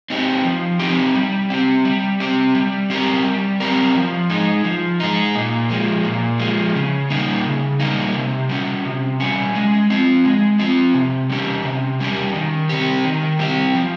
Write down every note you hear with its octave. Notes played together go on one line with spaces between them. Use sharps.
C4 D#4 G4
F3
C4 D#4 G4
G3
C4 G4
G3
C4 G4
G3
C4 G4 A#4
G3
C4 G4 A#4
F3
G#3 D#4
F3
G#3 D#4
A#2
F3 G#3
A#2
F3 G#3
C#3
G3 A#3 D#4
C#3
G3 A#3 D#4
C3
G3 C#4
C3
G3 C#4
G#3
C4 F4
G#3
C4 F4
C3
G3 C#4 G4
C3
G3 C#4 G4
D#3
G3 C4 G4
D#3
G3 C4 G4
F3